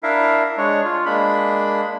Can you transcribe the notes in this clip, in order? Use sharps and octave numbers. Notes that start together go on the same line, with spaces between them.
D4 E4 A#4 E5 F5
G#3 D4 C#5
F4
G#3 A#3 D4 B5